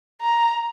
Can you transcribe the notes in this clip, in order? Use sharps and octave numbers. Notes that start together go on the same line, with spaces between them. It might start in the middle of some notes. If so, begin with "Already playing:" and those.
A#5